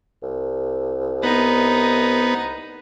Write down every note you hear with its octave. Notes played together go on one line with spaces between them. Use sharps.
C2
B3 D#4